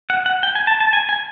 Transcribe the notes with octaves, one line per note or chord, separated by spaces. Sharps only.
F#5
F#5
G5
G#5
A5
A5
G#5
G#5